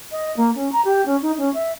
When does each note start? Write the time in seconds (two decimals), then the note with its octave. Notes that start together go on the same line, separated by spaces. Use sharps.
0.12 D#5
0.37 A#3
0.55 C#4
0.72 A#5
0.85 G4
1.06 C#4
1.22 D#4
1.38 C#4
1.54 E5